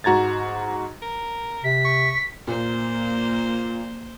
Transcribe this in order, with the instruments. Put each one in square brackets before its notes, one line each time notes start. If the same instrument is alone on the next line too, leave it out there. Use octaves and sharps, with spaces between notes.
[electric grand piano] G#2 F#4 A#5 G#6 A6
[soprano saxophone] A#4
[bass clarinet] C3 [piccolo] B6
[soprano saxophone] C#6
[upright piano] A#2 [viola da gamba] A#3 C5